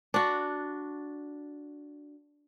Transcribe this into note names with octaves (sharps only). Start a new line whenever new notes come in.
D4 F#4